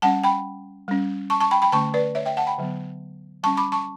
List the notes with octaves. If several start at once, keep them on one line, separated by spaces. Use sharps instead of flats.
G3 C#4 F#5 A5
G5 B5
G3 C#4
A5 C#6
A5 C#6
G5 B5
G5 B5
D3 A3 C#4 A5 C#6
B4 D5
C#5 E5
E5 G5
F#5 A5
G5 B5
D3 F#3 B3
G3 C#4 A5 C#6
B5 D6
A5 C#6